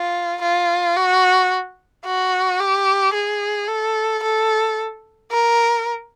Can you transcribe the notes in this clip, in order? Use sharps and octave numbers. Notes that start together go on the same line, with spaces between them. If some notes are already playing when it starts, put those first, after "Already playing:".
Already playing: F4
F4
F#4
F#4
G4
G#4
A4
A4
A#4